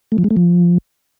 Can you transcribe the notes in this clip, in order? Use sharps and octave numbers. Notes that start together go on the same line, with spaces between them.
A3
F3
G#3
A3
F3